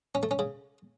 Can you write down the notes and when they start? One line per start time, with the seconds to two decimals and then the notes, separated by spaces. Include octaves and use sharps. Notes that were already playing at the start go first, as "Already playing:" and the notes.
0.15 C#4
0.23 A3
0.31 C#4
0.39 C#3